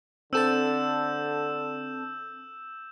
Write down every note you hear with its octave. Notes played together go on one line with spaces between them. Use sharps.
D3 C4 A4 A5 E6 G6 E7